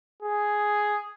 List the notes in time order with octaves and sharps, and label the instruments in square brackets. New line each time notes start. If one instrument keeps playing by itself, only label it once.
[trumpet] G#4